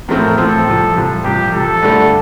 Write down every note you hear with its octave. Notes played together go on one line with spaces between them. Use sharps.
A2 F3 A3 C4 A#4
A2 F3 A3 C4 A4
C2 C3 F3
C2 C3 F3
C2 C3 F3 G4
C2 C3 F3 A4
G2 D3 A3